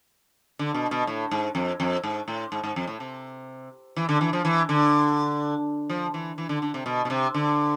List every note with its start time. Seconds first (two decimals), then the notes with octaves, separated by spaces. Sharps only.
0.59 D3
0.74 B2
0.91 B2
1.07 A2
1.31 G#2
1.55 F2
1.80 F2
2.03 G#2
2.28 A2
2.52 G#2
2.63 G#2
2.76 F2
2.87 A2
3.00 C3
3.96 E3
4.09 D3
4.21 E3
4.33 F3
4.45 E3
4.69 D3
5.89 F3
6.14 E3
6.38 E3
6.49 D3
6.62 D3
6.74 C3
6.86 B2
7.05 B2
7.10 C3
7.34 D3